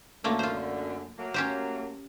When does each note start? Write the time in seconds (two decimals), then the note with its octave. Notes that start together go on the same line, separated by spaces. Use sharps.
0.24 F#2 D3 A3 A#3 F4
0.39 F4 C5
1.18 F#3 A3 A#3
1.34 C#4 G4 C5